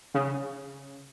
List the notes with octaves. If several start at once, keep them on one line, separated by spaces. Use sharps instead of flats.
C#3